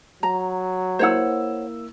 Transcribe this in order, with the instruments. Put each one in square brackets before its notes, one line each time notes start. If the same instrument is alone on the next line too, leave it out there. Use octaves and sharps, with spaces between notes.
[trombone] F#3 [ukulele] A#5
[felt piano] A#3 E4 E6 [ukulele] C5 C#5 F#5